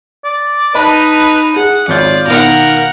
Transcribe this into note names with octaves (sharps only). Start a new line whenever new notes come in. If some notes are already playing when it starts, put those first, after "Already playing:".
D5
D#4 B4 D#5 A5 B5
G#4 F#5
G#1 F4 C#5 D5 G6
B2 D#3 A#4 F5 F#5